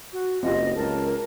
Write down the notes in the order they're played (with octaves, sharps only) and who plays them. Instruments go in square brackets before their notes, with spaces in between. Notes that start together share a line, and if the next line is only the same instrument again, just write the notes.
[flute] F#4
[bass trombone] F#1 [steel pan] C4 F4 G4 [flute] D#5
[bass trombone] C#2 [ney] A#4 [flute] A5